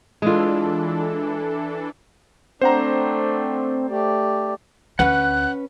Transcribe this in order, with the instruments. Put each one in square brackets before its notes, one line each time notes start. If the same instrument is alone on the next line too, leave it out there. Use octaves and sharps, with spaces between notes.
[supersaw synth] E3 D4 A4 [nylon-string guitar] G#3 F4
[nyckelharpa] A3 D4 [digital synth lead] C4 [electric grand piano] C5 F#5 A#5
[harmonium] A3 G4 [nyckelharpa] D5
[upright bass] D2 [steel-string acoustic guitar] C#4 B4 [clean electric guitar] F#5 [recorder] F#6